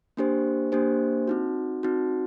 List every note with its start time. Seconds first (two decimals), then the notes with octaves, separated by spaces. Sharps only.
0.17 A#3 D4 G4 C5
0.72 A#3 D4 G4 C5
1.28 C4 D#4 F#4
1.83 C4 D#4 F#4